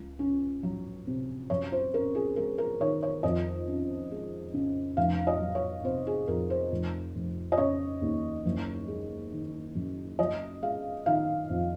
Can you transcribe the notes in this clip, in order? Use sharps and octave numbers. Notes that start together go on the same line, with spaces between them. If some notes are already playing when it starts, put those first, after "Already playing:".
Already playing: C#2
C#4
F#3
C3
F#2 C#5
C5
C#4 A#4
G#4
G#3 A#4
A#4
D#3 C#5
C#5
F2 D#5
C#4
G#3
C#3
F1 F5
D#5
F#3
C#5
C3 C5
G#4
F2 A#4
C5
F1
F1
D#5
C#3 C#5
D#2
F#1
G#3
D#3
F#2
F#1 D#5
G#3 F5
D#3 F5
F2